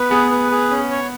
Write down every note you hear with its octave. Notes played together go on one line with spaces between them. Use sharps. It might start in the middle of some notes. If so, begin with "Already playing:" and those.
Already playing: B3 B4
B3 G#4
B4
G#4
C#4
C#5